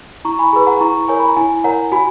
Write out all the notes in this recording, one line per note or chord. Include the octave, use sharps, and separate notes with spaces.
E4 A#5 C#6
G#5 B5
G#4 B4 G#5 B5
F#5 A#5
E4 A#5 C#6
A#4 C#5 G#5
B5
A#5
E4 G#5
A#4 C#5 F#5 A#5
F#4 G#5 B5